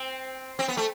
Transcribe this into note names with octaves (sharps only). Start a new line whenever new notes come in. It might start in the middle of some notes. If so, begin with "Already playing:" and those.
Already playing: C4
C4
B3
A3